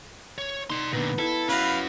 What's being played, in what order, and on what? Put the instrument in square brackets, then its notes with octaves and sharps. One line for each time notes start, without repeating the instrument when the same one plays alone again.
[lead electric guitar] C#5
[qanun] D#4 [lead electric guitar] D5 C6
[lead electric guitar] A#2 D3 [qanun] B3
[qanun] E4 E5 [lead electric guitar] A4
[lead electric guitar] C#4 F#4 [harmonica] B4 F5